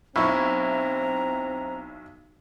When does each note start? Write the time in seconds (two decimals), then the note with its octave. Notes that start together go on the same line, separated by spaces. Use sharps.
0.16 B1 C4 E4 A#5 B5 C#6 E6